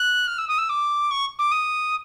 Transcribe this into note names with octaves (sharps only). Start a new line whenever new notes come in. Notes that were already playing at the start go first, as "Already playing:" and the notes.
Already playing: F#6
F6
E6
D#6
E6
D6
C#6
D6
D#6